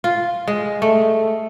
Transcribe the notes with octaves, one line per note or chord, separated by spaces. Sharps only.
F4
G#3
A3